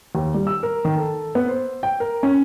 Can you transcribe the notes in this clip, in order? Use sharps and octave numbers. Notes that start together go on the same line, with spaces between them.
D#2
G3
E6
A#4
D#3
A4
B3
C5
G5
A#4
C#4